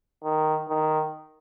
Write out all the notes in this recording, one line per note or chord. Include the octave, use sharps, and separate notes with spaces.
D#3
D#3